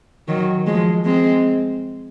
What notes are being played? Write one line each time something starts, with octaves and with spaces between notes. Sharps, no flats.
D#3 F#3
F3 G#3
G#3 C4